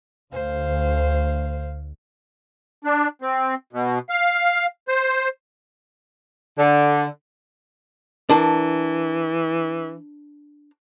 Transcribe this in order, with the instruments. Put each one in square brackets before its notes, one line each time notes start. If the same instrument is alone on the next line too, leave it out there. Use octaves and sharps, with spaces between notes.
[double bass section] D2 [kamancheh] C5 F5
[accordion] D4
C4
B2
F5
C5
[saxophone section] D3
[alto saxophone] E3 [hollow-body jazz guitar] D4 A#4 A5